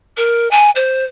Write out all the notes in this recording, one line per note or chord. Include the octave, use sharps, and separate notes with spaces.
A#4
G#5
C5